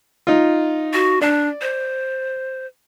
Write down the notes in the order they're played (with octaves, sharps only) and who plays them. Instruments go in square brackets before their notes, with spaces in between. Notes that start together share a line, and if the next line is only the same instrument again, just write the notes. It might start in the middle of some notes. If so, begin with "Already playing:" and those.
[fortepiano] D#4 F4
[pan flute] F#4
[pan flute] D4 [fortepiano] D5
[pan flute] C5